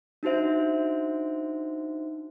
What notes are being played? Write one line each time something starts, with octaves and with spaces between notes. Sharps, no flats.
D4 D#4 F#4 C5 E5